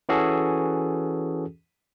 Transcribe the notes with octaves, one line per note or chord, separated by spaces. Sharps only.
E3 C#4 F#4 G#4 A4